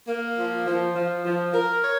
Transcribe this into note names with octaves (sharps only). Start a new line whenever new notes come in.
A#3
F3
F3
F3
F3
A#4
C#5